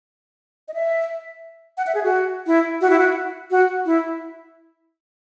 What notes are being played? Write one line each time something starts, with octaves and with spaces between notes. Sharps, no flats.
D#5
E5
F#5
E5
G#4
F#4
E4
F#4
E4
F#4
F#4
E4